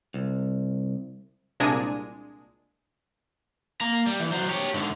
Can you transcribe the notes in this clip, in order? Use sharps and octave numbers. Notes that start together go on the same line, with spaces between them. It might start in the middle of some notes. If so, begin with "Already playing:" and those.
C2
C2 A#2 G#3 D4 G#5 D#6
A#3 A#5
G3
E3
F#3 C5
G4 C#5
G#2 D3